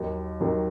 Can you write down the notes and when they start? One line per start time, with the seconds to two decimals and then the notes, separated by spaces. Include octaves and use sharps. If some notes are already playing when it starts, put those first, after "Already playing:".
Already playing: D#2 D#3 F#3
0.41 D#2 D#3 F#3